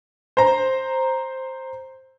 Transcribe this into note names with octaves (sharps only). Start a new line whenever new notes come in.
C5 A#5